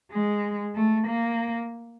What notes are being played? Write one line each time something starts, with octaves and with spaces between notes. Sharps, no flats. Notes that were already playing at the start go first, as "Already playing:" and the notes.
G#3
A3
A#3